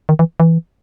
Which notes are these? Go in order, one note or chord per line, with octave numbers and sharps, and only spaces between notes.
D#3
E3
E3